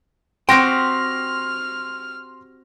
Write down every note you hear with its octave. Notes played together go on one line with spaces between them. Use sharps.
C4 F#4 G4 G5 C6 F6 A#6